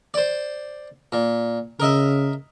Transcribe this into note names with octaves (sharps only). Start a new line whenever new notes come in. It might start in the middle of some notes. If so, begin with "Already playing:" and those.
C5 D5
A#2
C#3 A#4 D#5 E5